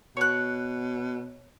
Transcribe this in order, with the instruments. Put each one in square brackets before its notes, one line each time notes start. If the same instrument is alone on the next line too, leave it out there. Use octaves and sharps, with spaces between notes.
[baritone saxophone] B2 [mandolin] C#5 F#6